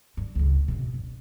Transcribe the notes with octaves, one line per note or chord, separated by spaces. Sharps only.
G2
F1 C#2
G#1 B2
G2